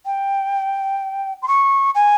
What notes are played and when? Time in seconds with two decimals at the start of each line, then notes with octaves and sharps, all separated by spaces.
0.06 G5
1.42 C6
1.48 C#6
1.95 G#5